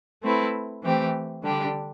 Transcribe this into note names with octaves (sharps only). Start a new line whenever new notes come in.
A3 C4 E4 B4
E3 A3 C4 G4
D3 G3 D4 G4